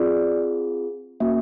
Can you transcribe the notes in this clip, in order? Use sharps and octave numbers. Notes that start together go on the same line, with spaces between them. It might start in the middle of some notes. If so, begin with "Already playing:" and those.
Already playing: C4 F4 G#4 D5
A#3 C#4 F#4 E5